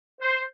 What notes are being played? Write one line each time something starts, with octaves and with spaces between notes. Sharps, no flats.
C5